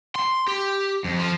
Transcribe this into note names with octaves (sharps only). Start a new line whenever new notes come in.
C6
G4
F2
F3